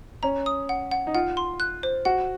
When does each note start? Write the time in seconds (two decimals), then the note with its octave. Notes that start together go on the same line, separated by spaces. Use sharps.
0.23 C#4 A#5
0.46 D#6
0.69 F#5
0.91 F#5
1.07 D#4
1.14 F4 F#5
1.37 C6
1.60 F#6
1.83 C5
2.05 F#4 F#5